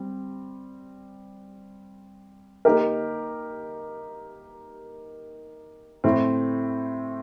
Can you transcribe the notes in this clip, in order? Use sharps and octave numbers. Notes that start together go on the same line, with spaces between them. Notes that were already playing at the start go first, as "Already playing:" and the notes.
Already playing: G3 C4
A#3 D#4 G4 A#4
A2 A3 C4